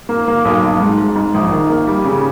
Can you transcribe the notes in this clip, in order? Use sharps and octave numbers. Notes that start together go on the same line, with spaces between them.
A#3
A#3
B1
B1
G#2
G#2
G#2
A#1
D#3
A#3
G3
C#3